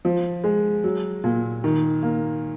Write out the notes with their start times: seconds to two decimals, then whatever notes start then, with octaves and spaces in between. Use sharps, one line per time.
0.05 F3
0.44 G#3
0.84 F#3
1.24 A#2
1.64 D#3
2.02 A#3